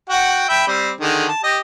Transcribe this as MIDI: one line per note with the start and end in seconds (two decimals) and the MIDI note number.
0.10 0.48 66
0.10 0.48 78
0.10 0.48 79
0.49 0.67 76
0.49 0.67 79
0.49 0.67 83
0.68 0.91 55
0.68 0.91 60
1.01 1.27 50
1.01 1.27 51
1.01 1.27 68
1.28 1.41 81
1.43 1.59 67
1.43 1.59 75